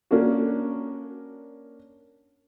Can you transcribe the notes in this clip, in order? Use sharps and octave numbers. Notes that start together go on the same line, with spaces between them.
A#3 C#4 D4 F#4